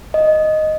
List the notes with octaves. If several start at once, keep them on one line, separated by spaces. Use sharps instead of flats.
D#5